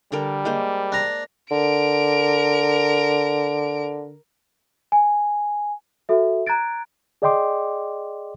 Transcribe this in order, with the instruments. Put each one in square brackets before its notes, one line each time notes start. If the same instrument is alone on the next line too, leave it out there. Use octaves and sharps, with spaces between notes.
[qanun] D3 A4 A#4 [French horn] G3
[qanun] G#3 A#3 C5
[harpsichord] D4 A#5
[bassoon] D3 [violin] A#4 D7
[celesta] G#5
F#4 A4 E5
A#5 F#6 G#6 A6 D7
[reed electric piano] G#4 D5 D#5 G5 C6 D6